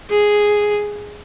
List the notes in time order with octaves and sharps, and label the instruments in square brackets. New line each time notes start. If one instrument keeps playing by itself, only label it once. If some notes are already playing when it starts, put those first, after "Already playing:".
[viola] G#4